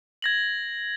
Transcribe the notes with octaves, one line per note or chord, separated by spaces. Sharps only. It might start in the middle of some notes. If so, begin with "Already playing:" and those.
G#6 A#6 F#7